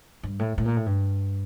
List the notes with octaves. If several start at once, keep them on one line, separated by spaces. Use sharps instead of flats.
G2
A2
A2
A#2
A2
G2